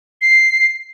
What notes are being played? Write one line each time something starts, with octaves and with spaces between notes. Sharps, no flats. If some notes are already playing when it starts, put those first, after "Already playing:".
C7